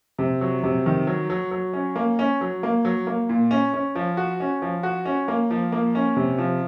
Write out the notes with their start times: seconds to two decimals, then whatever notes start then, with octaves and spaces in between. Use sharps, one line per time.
0.18 C3
0.41 F#3
0.63 C3
0.86 D#3
1.07 F#3
1.30 F#3
1.51 F#3
1.73 C#4
1.96 A#3
2.19 C#4
2.41 F#3
2.63 A#3
2.85 F#3
3.07 A#3
3.29 A#2
3.51 C#4
3.74 C#4
3.95 F3
4.17 F#4
4.40 C#4
4.62 F3
4.83 F#4
5.06 C#4
5.28 A#3
5.51 F3
5.72 A#3
5.95 C#4
6.16 C3
6.38 F3